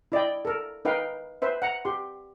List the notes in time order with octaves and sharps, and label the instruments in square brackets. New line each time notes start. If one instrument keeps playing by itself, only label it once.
[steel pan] E4 D5 D#5 G5
A4 A#4
D#4 A#4 B4 F5 G5
B4 C5 E5
F#5 A#5
G4 C6